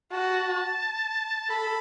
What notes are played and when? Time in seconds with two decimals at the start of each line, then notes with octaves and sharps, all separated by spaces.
0.12 F#4 A5
1.49 A4 B5